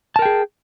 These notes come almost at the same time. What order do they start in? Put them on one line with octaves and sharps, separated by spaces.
A5 A#4 G5 G#4